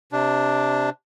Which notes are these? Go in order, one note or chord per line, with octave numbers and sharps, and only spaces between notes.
C3 D4